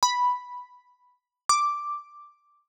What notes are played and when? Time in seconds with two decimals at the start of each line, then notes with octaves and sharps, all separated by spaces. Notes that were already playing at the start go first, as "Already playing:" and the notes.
0.03 B5
1.49 D6